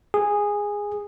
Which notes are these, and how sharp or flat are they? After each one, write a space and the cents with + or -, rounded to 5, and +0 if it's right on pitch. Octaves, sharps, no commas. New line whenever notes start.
G#4 -10